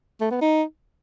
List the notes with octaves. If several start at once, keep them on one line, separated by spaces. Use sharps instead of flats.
A3
B3
D#4